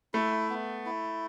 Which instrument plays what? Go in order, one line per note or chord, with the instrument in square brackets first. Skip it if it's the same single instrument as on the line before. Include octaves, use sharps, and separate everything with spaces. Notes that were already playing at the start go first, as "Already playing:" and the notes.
[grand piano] A3 [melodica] E4
[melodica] B3
E4